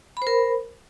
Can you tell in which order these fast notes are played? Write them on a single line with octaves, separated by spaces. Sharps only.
B5 C5 A#4